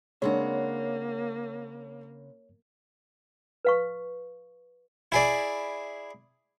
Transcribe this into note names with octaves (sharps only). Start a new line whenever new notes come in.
C#3 G#3 A#3 C4 D4 C#5 F#5
B4 F5 C#6
E4 G#4 D5